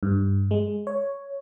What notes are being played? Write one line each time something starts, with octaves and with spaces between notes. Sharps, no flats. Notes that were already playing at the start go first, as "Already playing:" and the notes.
G2
G#3
C#5